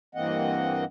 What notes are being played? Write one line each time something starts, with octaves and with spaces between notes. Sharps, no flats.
G2 E3 A#3 C4 D#5 F#5